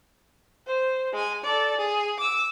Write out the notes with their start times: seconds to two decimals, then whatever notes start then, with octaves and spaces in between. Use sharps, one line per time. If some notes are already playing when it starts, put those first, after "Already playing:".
0.66 C5
1.13 G#3 G#5
1.44 A4 D5
1.77 G#4
2.18 D6 E6